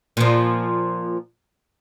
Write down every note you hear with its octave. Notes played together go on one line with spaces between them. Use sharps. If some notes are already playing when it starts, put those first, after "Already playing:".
A#2 F3